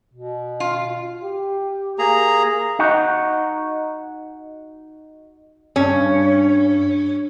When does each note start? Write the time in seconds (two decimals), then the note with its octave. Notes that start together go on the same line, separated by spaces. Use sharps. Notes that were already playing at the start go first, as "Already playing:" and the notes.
0.13 B2
0.60 F4
1.23 G4
1.99 A#3 G#4 A#5
2.79 D#4 F#4
5.76 G2 C#4